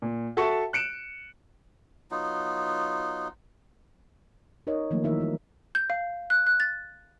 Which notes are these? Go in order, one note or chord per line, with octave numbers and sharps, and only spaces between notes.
A#2
F#4 A4 E5 A5 C#6
F#6 C#7 D7 E7
F#3 B3 D#4 F4
D#4 A#4 C#5 D#5
D#3 F3 F#3 A3 A#3
D#3 E3 D#4 E4 A#4 E5
G3 A#4
G6
F5
F#6
F#6
A6